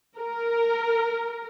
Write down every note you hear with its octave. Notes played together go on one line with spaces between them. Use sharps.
A#4